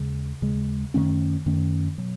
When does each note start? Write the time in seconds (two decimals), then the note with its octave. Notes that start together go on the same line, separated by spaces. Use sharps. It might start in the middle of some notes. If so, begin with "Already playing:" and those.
Already playing: D#2 C#3 G#3
0.42 D#2 C#3 G#3
0.94 F#2 D#3 A3 C#4
1.46 F#2 D#3 A3 C#4
1.98 B2 F#3